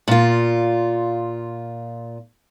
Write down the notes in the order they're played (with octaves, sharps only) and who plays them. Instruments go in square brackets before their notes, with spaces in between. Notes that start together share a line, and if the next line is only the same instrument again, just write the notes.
[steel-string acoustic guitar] A#2 F4